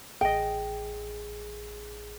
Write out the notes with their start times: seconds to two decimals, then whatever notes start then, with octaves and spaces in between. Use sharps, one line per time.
0.21 A1 G#4 D#5 G5